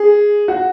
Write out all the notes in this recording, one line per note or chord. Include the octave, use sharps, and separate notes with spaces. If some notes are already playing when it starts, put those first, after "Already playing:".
Already playing: G#4
F#4